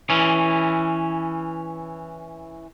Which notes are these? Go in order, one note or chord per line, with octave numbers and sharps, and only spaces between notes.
E3 C#4